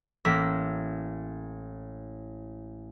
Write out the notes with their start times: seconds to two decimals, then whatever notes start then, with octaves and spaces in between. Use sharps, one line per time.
0.25 A1 A#3 E6 B6